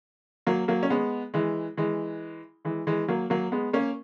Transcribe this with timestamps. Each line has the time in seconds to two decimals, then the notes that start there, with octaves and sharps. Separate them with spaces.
0.47 F#3 A#3
0.68 F#3 A#3
0.83 C#4
0.90 G#3 B3
1.34 E3 G#3
1.77 E3 G#3
2.65 E3 G#3
2.87 E3 G#3
3.08 F#3 A#3
3.30 F#3 A#3
3.52 G#3 B3
3.73 A#3 C#4